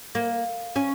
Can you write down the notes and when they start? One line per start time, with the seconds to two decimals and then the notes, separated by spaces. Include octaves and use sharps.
0.15 A#3
0.76 C#4